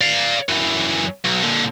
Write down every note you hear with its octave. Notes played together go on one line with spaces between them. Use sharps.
D5 F5
F#2 E3
B1
A#2 D3